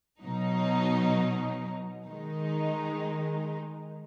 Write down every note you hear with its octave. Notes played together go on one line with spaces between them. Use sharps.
B2 F#3 D#4
D#3 G#3 D#4